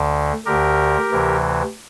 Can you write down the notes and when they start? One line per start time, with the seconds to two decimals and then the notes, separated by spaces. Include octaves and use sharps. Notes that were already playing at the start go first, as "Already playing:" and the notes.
Already playing: D2 D3
0.46 D2 D3 G4 A#4
1.11 D2 C3 E3